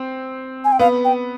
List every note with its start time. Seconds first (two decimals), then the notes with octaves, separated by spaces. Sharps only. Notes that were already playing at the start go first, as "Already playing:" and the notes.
Already playing: C4
0.65 G#5
0.72 G5
0.79 B3 F5
1.05 G5